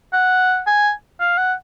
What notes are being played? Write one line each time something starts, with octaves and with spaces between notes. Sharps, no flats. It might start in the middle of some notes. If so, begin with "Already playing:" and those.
F#5
G#5
F5
F#5